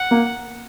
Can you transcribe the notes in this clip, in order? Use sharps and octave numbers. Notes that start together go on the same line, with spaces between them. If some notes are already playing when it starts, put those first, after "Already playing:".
Already playing: F#5
A#3